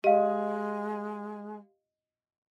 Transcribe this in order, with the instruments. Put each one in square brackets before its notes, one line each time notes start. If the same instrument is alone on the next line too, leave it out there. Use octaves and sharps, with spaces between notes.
[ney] G#3 [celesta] G4 F5 [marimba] D#5